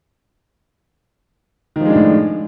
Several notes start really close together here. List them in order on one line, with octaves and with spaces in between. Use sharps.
D#3 F3 G#3 D4 A2